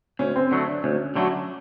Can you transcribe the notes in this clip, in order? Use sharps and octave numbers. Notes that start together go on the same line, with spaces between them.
D2 C#4
C4
D3 F#3 A3
D4
D2 C#4
D3 F#3 A3